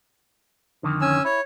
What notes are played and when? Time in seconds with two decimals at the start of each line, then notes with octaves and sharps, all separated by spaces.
0.83 F2 D3 D#3
1.01 C#4 G#5 E6
1.25 E4 C#5